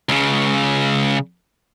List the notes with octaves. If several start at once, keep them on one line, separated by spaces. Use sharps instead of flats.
C#2 C#3